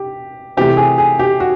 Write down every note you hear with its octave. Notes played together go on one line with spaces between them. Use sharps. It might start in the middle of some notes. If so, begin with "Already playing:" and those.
Already playing: G4
C3 E3 A3 G4
G#4
G#4
G4
F#4